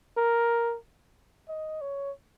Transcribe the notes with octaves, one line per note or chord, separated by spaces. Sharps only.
A#4
D#5
C#5